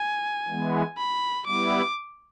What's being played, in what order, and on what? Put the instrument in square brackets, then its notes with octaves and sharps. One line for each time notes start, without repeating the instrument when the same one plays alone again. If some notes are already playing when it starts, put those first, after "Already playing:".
Already playing: [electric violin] G#5
[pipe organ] E3 G#3 B3
[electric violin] B5
[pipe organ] G3 B3 E4 [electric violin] D6